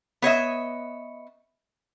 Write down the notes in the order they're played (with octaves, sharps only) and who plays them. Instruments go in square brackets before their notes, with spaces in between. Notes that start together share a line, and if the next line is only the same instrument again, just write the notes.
[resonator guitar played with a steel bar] B3 C#5 D#5 E5